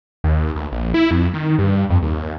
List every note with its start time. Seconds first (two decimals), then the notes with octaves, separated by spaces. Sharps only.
0.24 D#2
0.56 D2
0.72 A#1
0.94 E4
1.11 F2
1.34 D#3
1.59 G2
1.90 F2
2.02 D#2
2.21 D#2